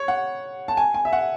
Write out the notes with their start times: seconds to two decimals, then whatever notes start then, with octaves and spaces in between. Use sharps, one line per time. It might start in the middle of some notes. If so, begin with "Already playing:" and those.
Already playing: C#5
0.08 F#5
0.68 A5
0.77 G#5
0.94 G#5
1.05 E5
1.13 F#5